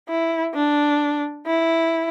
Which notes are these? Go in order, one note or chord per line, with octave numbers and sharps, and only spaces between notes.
E4
D4
E4